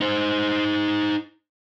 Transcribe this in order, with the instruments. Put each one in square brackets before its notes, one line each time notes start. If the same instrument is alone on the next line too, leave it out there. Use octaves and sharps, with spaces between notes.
[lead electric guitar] D#4 C5